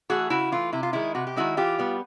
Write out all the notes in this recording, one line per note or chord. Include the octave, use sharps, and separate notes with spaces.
E3 A3 F#4 G#4
C#3 E4 F#4
E3 A3 F4
C3 E4
F4
D#3 G#3 E4
C3 F#4
G4
D#3 G#3 E4 F#4
E3 F4 G4
G3 B3